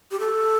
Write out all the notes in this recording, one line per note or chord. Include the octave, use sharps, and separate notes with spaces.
G4
A4